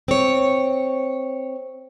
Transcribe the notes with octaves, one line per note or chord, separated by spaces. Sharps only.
C4 C#5